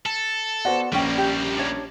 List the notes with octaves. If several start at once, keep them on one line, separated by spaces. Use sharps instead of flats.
A4
B3 F#4 C5 D5 F#5
A#1 G3 A#3 C#4 A#4 G5 C#6
G4
D4 C#5